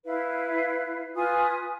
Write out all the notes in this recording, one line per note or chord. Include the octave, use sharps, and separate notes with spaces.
E4 B4 F5
F4 B4 G#5 D#6